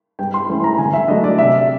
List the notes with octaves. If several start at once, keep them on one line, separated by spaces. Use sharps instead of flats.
G2 G5
C6
E3 A3 C#4 E4
A#5
D3 G#5
E5
F#3 A3 D4 D#5
D5
C3 E5